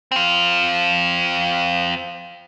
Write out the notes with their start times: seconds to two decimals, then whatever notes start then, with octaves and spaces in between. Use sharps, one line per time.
0.12 C4 F4